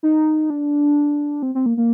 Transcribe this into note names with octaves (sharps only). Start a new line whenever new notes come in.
D#4
D4
C4
C4
A#3
A#3